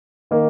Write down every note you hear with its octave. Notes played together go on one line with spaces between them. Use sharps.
D#3 A#3